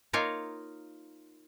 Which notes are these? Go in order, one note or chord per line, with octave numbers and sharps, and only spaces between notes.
A#3 D#4 F4 A#4 C#5 F5